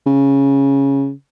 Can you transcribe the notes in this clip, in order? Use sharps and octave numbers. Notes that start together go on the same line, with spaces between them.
C#3